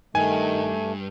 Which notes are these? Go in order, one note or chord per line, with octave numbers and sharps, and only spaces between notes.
G2 D#3 A3 G#5